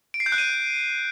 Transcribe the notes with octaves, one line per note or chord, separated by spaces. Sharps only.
D7
C7
G6
F#6
D#7